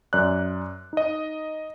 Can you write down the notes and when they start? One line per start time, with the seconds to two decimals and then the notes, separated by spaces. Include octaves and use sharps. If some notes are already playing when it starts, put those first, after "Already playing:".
0.13 F#2 D5 F#6
0.93 D#4 D#5